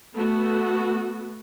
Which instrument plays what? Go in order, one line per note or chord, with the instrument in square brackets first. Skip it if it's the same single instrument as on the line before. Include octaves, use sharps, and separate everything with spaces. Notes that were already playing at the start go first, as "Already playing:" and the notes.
[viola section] A3 B3 F#4